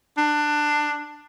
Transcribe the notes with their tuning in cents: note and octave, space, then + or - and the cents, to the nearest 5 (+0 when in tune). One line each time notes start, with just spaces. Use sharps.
D4 +15